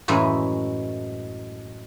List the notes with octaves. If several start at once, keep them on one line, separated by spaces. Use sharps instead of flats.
F#2 A2 E3 G#3